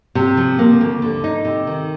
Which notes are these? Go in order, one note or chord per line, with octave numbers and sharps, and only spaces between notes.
C3
F3
A#3
D2
D3
D#4
C3
D#3